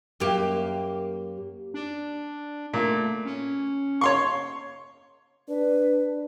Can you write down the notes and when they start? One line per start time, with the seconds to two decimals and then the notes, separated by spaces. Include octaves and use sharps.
0.20 F#2 A#3 G4
1.74 D4
2.74 A#2 A3
3.25 C#4
4.01 C#5 C6 C#6
5.48 D4 B4